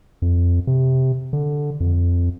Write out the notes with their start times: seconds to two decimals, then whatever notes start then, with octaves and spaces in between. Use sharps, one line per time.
0.22 F2
0.67 C3
1.33 D3
1.80 F2